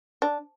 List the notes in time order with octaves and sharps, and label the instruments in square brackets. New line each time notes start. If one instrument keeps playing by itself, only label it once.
[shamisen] D4